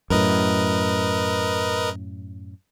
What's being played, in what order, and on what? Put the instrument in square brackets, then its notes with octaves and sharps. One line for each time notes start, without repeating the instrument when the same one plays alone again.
[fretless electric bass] F#2 A2 [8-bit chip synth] A#4 B4 D#5